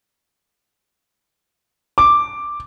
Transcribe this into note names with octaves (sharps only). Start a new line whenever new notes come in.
D6